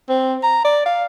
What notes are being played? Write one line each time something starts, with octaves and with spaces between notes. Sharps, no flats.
C4
A#5
D5
F5